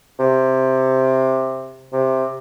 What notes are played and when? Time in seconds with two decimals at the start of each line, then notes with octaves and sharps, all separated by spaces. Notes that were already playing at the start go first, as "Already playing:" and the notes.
0.20 C3
1.93 C3